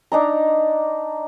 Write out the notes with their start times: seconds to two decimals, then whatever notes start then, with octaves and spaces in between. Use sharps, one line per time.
0.12 D4 D#4 A#5